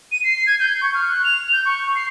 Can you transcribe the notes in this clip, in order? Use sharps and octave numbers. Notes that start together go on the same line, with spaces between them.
D#7
C7
G#6
G6
C#6
F6
F#6
F7
G6
C#6
C7